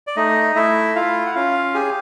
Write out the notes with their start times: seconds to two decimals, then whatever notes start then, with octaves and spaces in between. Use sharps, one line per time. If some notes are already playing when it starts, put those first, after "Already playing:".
0.07 D5
0.16 A3 D#4 D#5
0.56 A3 E4 E5
0.95 E4 F4 F5
1.26 F#5
1.35 C#4 F4 F5
1.74 G4 G#4 G#5